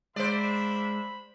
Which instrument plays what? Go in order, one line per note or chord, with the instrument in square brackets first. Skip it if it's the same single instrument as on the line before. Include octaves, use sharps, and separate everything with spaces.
[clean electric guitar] G#3 [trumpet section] A#3 D4 E5 [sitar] C5 D5 [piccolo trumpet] B5